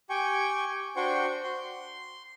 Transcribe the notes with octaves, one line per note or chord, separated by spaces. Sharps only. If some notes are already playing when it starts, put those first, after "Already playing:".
G4 G5 G#5 C#6
D4 F#4 C5 G5 C#6
C6